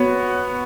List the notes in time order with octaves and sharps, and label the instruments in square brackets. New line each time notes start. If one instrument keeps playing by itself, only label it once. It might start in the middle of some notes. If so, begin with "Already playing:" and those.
Already playing: [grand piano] B3 F#4 C#5